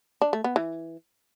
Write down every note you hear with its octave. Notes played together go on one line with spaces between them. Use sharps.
D4
A3
B3
E3